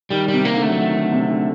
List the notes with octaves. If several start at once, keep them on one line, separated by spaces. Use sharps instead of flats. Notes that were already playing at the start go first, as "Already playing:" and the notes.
D#3 G3
G3
C3
A#3
D3
A3
F#3
D#3
D3
C3
D3